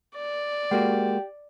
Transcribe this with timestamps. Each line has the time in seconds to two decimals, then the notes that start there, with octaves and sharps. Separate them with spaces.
0.15 D5
0.71 G#3 A#3 F#4 G4